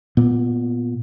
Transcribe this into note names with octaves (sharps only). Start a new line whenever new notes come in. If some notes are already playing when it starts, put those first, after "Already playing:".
A#2 B3